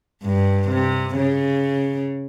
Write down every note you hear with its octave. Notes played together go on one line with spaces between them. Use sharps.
G2
C3
C#3